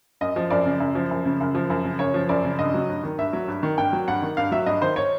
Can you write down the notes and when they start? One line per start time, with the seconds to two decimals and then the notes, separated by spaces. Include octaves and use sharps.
0.21 F#2 D#5
0.36 F3
0.50 F#2 D5
0.66 C#3
0.80 F#2
0.95 F3
1.11 F#2
1.25 C#3
1.41 F#2
1.55 F3
1.70 F#2
1.84 C#3
1.99 F#2 C#5
2.14 F3
2.29 F#2 D5
2.45 C#3
2.59 G2 D#5
2.74 F#3
2.89 G2
3.04 D#3
3.18 G2 E5
3.33 F#3
3.48 G2
3.63 D#3
3.78 G2 G5
3.93 F#3
4.08 G2 F#5
4.22 D#3
4.37 G2 F5
4.52 F#3 E5
4.66 G2 D#5
4.82 D#3 C5
4.96 C#5